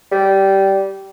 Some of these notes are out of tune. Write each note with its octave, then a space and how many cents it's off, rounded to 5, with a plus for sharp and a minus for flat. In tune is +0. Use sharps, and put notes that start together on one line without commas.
G3 -15